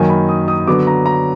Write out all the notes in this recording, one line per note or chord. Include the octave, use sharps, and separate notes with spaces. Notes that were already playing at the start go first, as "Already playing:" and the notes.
Already playing: F#2 D#3 F#3 A#3 G#5
B5
D#6
D#6
D3 F#3 B3 D6
A#5
A#5